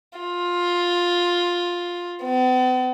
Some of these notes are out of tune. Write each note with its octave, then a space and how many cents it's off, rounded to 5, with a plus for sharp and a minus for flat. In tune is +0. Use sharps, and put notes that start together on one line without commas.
F4 +10
B3 +45